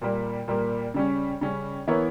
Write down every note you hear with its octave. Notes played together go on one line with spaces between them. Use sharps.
A#2 G3 A#3
A#2 G3 A#3
C#3 G3 C#4
C#3 G3 C#4
E3 B3 E4 A#4 C#5